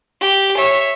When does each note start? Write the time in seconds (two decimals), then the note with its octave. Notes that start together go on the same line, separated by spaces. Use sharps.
0.21 G4
0.57 C#5 E5